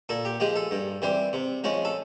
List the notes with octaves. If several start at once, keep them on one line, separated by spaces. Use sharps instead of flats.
A#2 A4
G4
F3 G#3 G4
A4
G2
E3 G3 C4
C3
F3 G#3 C#4
A4